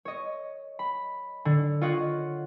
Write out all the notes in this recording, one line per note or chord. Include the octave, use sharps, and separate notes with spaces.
C#5 D#5
B5
D3
F4 C#5 D#5 F#5